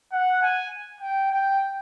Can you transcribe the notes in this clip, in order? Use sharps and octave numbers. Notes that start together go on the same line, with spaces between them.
F#5
G#5
G5
G5